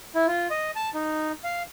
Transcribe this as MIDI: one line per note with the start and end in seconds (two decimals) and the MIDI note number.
0.15 0.26 64
0.27 0.47 65
0.50 0.71 75
0.76 0.89 81
0.94 1.32 63
1.44 1.63 77